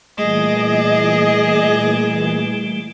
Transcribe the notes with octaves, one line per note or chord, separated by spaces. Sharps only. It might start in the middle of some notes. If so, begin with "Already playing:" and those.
A#2 E3 G3 A3 G#4 D#5